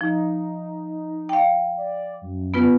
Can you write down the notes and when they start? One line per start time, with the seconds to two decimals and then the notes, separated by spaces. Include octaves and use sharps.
0.01 F3 D#4
1.29 F5 G5
1.77 D5
2.22 F#2
2.54 B3 F4 B4